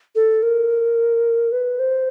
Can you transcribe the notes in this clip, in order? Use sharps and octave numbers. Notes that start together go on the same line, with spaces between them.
A4
A#4
B4
C5